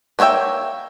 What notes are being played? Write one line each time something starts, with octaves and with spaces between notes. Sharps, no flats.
A#3 B3 C#5 E5 G5